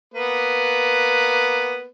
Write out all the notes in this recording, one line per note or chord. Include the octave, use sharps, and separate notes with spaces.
A#3 B3 B4